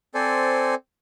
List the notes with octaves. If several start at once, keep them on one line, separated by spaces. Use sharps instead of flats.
C4 A4 C5 D5 G#5